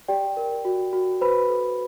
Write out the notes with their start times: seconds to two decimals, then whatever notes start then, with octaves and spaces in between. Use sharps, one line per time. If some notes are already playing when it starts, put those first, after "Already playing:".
0.08 G4 D5 G5
0.37 A#4
0.65 F#4
0.93 F#4
1.21 B4 C5 B5
1.49 A4